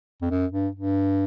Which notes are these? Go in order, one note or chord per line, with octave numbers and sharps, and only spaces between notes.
F2
F#2
G2
G2